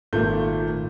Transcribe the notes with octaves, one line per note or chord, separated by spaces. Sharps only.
G#1 A#2 A3 G6